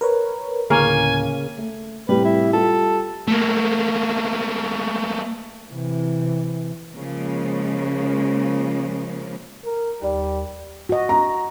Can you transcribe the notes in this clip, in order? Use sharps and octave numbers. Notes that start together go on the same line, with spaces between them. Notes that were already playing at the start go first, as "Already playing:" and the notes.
A#4 B4 C#5
D2 A2 C#3 A#3 C#4 G#5
A3
A2 C3 G3 B4
E4
G3 F4 A4
A3 A#3
C3 E3
C#3 F3 G#3 A#3
A#4
D#2 G3 D5
F#4 D#5
A#5